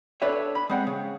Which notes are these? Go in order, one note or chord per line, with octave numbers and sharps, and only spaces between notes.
D4 A4 B4 C#5 E5
B5
G#3 C4 F#5
C#3